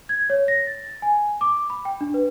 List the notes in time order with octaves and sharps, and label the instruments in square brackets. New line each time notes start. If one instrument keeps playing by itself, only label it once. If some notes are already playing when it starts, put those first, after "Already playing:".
[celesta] G#6
C#5
A#6
A6
G#5
D6
B5
G5
D4
B4